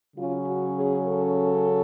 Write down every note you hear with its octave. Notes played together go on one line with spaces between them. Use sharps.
C#3 F#3 C#4 F4
F#4
G#4
A4